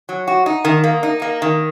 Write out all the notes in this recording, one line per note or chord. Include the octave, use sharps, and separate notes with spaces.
F#3
F#4
D#4
D#3
A#3
D#4
A#3
D#3